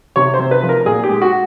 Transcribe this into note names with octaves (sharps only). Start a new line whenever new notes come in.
C3 C#5
C5
C3
B4
F3
A#4
A#2 G#4
G4
G#3
F#4